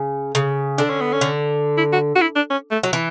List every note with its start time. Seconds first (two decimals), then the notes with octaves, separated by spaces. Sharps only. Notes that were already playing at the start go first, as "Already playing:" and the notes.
Already playing: C#3
0.35 C#3
0.78 D3 D4
0.90 C#4
1.01 B3
1.13 C#4
1.21 D3
1.78 E4
1.93 F#4
2.16 F#4
2.21 E4
2.36 D4
2.50 C#4
2.71 A3
2.83 F#3
2.93 E3